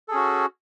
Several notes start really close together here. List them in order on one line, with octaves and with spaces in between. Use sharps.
A4 G#4 C#4 F#4